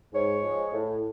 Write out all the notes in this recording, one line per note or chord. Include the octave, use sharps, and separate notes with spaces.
G#2 C#5
F3 G#3
A2